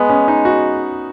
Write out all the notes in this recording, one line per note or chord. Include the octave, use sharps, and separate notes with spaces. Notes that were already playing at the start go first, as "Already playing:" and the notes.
Already playing: G#3 B3
C#4
D#4
F#4